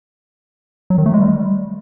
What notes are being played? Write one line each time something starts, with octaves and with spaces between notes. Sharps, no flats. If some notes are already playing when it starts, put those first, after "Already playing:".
F#3
D#3
A3
G#3
G3